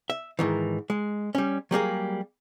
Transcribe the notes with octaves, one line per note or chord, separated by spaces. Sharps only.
E5
G#2 D#3 E3
G#3
G3 C#4
F#3 G3 A#3 G#4